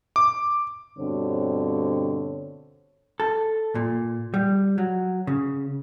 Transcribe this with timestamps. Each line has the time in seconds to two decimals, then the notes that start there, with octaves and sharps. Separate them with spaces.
0.16 D6
0.99 G2 B2 D3 C4 C5 C#5
3.20 A4
3.75 A#2
4.34 G3
4.78 F#3
5.27 C#3